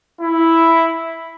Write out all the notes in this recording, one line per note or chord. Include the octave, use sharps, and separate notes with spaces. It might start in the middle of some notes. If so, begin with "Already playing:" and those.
E4